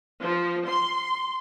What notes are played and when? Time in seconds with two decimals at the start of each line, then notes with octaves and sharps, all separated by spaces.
0.23 F3
0.69 C6